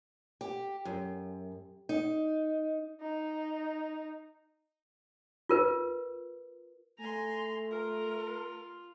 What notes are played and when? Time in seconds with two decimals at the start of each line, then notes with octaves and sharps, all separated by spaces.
0.41 G4
0.85 F#2
1.89 D#4
3.01 D#4
5.49 F4 A#4 B4
7.00 A3 G#5 A#5 C6
7.71 F4 A#4